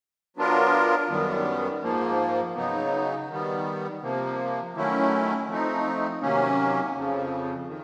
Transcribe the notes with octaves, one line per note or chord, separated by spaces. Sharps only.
F#3 B3 D4 F4 A#4
F#2 D#3 G3 B3
G#2 F3 A#3
C#3 F#3 B3 D#4
D#3 G3 B3
C3 F3 A#3
D#3 F#3 A3 C#4 E4
F3 A3 C4 D#4
C3 D#3 F#3 A#3 C#4
F2 C#3 F3
D#3